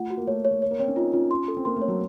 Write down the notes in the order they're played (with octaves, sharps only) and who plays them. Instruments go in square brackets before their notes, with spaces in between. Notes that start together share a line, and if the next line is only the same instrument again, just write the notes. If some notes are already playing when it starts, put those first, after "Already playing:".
Already playing: [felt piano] A3 [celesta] F4 F#5
[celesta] F#4
[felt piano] A#3
[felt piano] A3 [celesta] C#5
[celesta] C#5
[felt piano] A3
[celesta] C#5
[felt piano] A#3
[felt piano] C4 [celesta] C#5
[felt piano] C#4
[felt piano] D#4 [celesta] F4
[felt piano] C#4 [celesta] F4
[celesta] C6
A4
[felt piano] C4
[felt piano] A#3 [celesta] C6
[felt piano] A3
[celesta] C#5
[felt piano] F#3